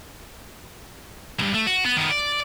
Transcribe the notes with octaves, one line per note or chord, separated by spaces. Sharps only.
B1 G2
A3
F#4
B3
D#3 B3
D5